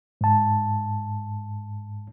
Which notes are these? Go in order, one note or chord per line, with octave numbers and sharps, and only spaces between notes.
G#2 A5